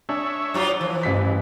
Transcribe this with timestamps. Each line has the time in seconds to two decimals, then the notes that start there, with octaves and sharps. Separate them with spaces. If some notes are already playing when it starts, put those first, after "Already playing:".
0.09 D4 C#5 E5 G#5 D#6
0.54 G2 F#3 F4
0.81 A#2 E3 F3
1.03 A1 G2 B6 C#7